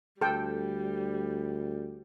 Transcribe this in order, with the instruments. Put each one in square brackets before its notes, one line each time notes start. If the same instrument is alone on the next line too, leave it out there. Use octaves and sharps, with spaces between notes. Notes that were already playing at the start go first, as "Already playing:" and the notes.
[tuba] D2 [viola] G3 [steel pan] A4 G5